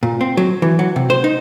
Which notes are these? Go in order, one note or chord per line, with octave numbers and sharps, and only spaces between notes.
A#2
C4
F#3
E3
F#3
C3
C5
D#4